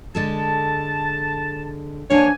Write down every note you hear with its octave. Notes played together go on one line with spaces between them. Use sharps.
D3 G#3 A4 A5
E3 F3 A#3 D4 C#5 F5 G#5